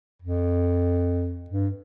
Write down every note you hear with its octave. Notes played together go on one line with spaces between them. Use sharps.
F2
G2